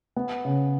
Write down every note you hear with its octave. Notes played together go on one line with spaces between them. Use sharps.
B3
C#3